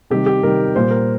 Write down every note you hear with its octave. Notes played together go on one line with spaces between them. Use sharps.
C3 D#3 G3 G4
G4
C3 D#3 G3 A#4
A#2 G3 C5
A#4